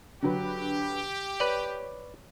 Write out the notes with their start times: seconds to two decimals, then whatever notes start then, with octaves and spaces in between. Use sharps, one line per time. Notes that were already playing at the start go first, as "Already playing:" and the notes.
0.23 D3 F#3 G4 B4
1.40 B4 C#5 D5